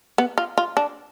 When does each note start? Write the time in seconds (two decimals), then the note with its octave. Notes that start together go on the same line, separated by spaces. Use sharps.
0.18 B3
0.38 F4
0.58 F4
0.77 D4